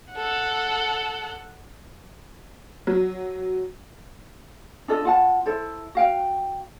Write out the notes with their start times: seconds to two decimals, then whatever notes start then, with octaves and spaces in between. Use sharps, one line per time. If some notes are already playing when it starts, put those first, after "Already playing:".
0.14 A4 F#5
2.87 F#3
4.88 D4 F4 A4 D#5
5.05 F4 F#5 A5
5.46 E4 A4 C5
5.95 F#4 F5 G5